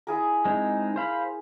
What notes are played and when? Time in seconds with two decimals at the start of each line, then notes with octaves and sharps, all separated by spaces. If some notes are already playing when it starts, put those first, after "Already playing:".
0.07 E4 G#4 A#4
0.45 G#3 C4 D#4
0.96 C5 F5 B5